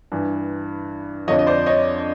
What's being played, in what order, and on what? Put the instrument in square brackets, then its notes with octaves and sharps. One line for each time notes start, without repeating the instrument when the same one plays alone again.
[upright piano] G2 E3
F2 D3 F3 C#5 D#5
D#5
C5 D5
C#5 D#5